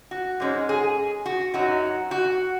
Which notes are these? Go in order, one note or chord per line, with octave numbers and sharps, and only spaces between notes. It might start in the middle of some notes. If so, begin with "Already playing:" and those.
F#4
G#2 G#3 C#4
G#4
F#4
F#2 F#3 D#4 F#4
F#4